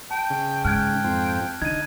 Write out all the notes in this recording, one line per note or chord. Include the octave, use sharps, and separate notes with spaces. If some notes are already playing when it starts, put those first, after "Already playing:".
G5 A5
C#3
G#2 G5 F6 F#6 G#6
F2 C4
D3 D#4 G#6 D#7